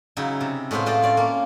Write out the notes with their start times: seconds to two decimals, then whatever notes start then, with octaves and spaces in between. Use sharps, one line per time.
0.17 C#3 F#3 D#4 E4
0.41 C3
0.71 A2 G#3 A3 B3 C5 F5
0.86 F4 A4 C5 D5 D#5
1.02 C#4 D5 F5
1.17 A#3 C#4